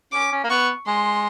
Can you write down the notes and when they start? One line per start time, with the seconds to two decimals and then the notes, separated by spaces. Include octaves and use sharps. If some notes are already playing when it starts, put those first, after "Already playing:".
0.12 C#4 D6
0.32 C#4
0.44 A#3
0.50 B3 C#6
0.87 G#3 C6